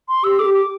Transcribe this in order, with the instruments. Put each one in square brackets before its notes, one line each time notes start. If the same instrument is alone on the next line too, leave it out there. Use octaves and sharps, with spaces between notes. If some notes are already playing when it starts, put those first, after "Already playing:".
[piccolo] C6
[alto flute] G4 [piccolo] E6
[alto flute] A4 [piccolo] D6
[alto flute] G4
[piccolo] D6